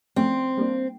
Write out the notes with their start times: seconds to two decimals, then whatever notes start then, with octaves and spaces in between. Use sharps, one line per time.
0.16 F3 A3 C4 C#4
0.58 G3 A#3 D4